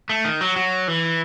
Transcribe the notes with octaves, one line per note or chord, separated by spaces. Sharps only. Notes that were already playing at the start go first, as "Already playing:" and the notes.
A3
D#3
F#3
F#3
E3